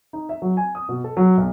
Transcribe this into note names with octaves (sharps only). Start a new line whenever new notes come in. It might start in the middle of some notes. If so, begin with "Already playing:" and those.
D#4
E5
F#3
G#5
D#6
B2
A4
F#3
B1